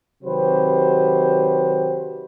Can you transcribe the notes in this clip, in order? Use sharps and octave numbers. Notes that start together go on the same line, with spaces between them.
C3 D#3 F#3 G4 B4 C5